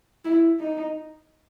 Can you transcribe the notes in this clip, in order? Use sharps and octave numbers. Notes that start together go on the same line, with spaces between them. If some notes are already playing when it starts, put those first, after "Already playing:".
E4
D#4